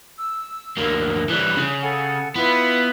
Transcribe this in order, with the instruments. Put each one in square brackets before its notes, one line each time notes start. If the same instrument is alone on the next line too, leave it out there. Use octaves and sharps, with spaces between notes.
[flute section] E6
[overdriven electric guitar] D2 A#3
[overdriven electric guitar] E3 G3 [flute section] F#6
[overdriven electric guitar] C#3
[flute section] A4 F#5 G#5
[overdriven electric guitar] B3 [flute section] E4 F4 B4